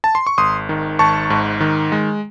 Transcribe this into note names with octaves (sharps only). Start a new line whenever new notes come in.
A5
C6
C#6
G#1 C6 D#6
D#3
G#1 A5 C#6
G#2
D#3
G#3